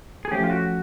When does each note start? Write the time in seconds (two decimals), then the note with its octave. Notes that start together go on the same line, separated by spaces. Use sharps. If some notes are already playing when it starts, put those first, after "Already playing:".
0.25 G#4
0.31 F3 A3 C#4 G4
0.43 F4
0.50 F#4